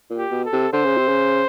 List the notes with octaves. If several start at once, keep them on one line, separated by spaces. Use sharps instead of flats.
A#2
G4
B2
A4
C3
D3 C5
C#3
C3
C#3